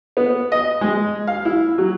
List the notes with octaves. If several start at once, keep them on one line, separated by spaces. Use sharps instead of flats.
B3
D#5
G#3
F5
E4
F#3